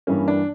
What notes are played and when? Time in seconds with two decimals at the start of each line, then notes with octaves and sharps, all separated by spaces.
0.07 G2 E3 G3 A#3 C#4
0.28 D4